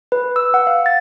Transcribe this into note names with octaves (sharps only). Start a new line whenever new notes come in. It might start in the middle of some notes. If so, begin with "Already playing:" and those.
B4
E6
F#5
F5
A6